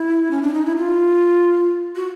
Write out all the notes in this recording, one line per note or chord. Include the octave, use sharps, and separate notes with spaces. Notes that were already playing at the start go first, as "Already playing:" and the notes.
Already playing: E4
C#4
D4
D#4
E4
F4
F#4